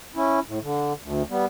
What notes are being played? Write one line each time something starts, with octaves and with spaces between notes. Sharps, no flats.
C#4 E4
A2
D3
D2
G3 B3